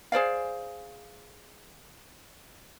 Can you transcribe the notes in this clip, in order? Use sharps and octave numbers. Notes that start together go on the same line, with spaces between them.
G#4 C5 D5 F5